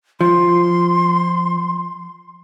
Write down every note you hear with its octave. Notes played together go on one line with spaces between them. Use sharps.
F3 C6